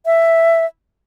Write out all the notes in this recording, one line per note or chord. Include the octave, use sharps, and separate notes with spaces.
E5